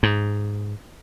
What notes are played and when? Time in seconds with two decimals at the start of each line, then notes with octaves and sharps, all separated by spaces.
0.03 G#2